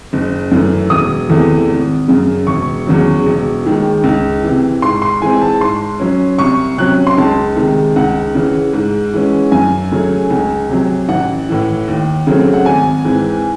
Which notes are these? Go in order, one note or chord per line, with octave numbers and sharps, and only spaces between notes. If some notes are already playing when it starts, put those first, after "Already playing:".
F#1
F#2 E3 A3
E1 D#6
E2 C3 E3 A3
G#1
F#2 C#3
E1 C#6
E2 C#3 F#3
E1
D#2 D#3 G#3
C#2
C3 E3
G#2 C6
C6
E3 G#3 C4 G#5
A5
G#2 C6
F#3 C#4
C2 C#6
C3 F#3 C#4 F#6
C6
C#2 A5
C3 D#3 G#3
C#2 F#5
C#3 E3
G#2
E3 G#3 C#4
F#2 G#5
C#3 F#3 A3
C#2
C3 F#3
A1 F#5
A2 E3
D#2
C#3 F#3 A3 C4
F#5
G#1 G#5
G#2 E3 C4